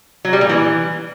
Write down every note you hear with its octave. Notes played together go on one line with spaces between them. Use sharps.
F#3
G3
A#2
E3